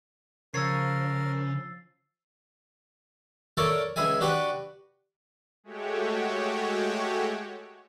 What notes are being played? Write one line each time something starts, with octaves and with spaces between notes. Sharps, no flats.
C#3 F3 A#4 C#5 E6 A6 C7
A4 A#4 C#5 D5 E5
C#2 E4 G#4 E5 G#5
D4 F#4 G4 B4 F#5
G#3 A3 F#4 G4 C#5